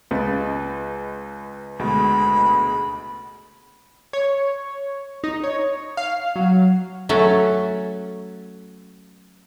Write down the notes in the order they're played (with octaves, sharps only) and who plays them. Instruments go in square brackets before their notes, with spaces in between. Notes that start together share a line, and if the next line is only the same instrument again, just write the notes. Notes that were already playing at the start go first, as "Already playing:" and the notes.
[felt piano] C#2 [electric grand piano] B4 D#5 A6
[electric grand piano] D2 B2 G#3 [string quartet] B5
[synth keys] C#5
D#4
C#5
F5
F#3
[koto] F#3 A3 C#4